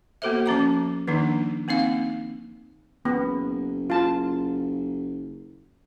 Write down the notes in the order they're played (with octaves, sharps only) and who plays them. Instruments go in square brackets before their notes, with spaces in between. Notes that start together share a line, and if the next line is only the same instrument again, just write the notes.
[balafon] A#3 B3 F#4 A4 C5 E5
F3 C#4 A#5 D6
D#3 F3 A#3 D4 D#4
A#3 C4 D#4 F5
[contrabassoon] F#1 [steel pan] B3
[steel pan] F4 A5